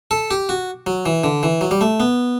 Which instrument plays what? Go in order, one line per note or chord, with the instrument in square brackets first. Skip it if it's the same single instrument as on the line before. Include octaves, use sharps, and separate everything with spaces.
[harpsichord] A4
G4
F#4
F#3
E3
D3
E3
F#3
G3
A3
B3